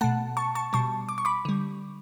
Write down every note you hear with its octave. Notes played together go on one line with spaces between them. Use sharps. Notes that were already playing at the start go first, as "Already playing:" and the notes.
B2 A3 F#5 A5
A5 C#6
A5 C#6
B2 G3 A5 C#6
D6
C#6
B5 D6
D3 G3